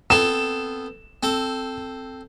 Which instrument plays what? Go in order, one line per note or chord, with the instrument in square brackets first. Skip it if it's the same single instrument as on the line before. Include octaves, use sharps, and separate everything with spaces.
[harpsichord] B3 C4 A4 [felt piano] E7
[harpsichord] C4 A4